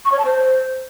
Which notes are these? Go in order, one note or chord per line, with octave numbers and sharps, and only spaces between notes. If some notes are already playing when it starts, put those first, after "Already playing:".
C#6
C#5
A5
C5